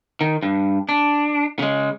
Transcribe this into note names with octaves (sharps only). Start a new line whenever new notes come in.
D#3
G2
D4
C#3 G#3